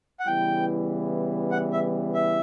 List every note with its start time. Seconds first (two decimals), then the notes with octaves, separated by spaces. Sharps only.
0.20 F#5
0.27 C#3 E3 G3 B3 E4 G5
1.52 F#5
1.73 E5
2.14 E5